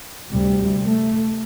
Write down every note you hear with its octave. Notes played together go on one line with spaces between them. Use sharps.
D2 C3 G3
A3